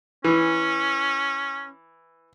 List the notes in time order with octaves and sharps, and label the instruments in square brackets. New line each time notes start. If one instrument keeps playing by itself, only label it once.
[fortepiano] E3 [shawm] C#4